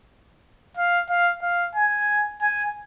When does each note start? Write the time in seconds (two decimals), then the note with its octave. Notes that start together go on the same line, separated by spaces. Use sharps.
0.77 F5
1.10 F5
1.43 F5
1.75 G#5
2.42 G#5